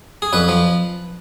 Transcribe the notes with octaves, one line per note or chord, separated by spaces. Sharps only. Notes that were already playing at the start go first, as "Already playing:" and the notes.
G#4
F2 B4
F3